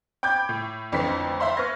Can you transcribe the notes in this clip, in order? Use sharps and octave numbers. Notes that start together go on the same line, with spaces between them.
G5 B5 D6 G6 G#6
A2
A1 F2 D3 E3 C5 B6
C5 E5 F5 B5 C6
B4 C#6 F6 G#6 A#6